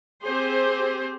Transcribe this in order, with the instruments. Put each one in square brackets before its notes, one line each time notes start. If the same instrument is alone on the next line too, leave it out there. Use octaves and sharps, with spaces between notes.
[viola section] C4 G4 G#4 C5